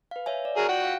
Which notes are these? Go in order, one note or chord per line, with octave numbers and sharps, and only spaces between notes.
B4 F5
C#5 E5 G#5
D5
F#4 G#4 A#4
F4 F#4 F#5 G5
F5